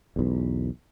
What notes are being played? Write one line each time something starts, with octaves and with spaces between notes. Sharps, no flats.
B1 E2